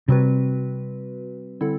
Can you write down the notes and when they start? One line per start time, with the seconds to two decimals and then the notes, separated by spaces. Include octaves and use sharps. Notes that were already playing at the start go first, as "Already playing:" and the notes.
0.08 C3 G3 C4 F#4 B4
1.61 D3 G3 C4 E4 A4